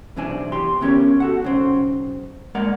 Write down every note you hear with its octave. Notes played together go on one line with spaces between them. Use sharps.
B1 E2 C3 C4 D4 G#5
E2 G4 C6
D3 B3 C#4 G4 A#4 C#5
F#4 A4 F#5
B1 C#3 C4
G#3 A#3 A#4 D5 F#5